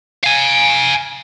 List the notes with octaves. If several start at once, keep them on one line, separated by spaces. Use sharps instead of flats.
F5 G#5